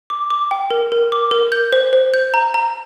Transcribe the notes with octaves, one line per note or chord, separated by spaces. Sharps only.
D6
D6
G5
A#4
A#4
D6
A#4
G6
C5
C5
G6
A#5
A#5